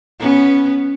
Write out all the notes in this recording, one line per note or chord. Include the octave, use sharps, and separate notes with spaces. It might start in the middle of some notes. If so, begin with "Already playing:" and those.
B3 C#4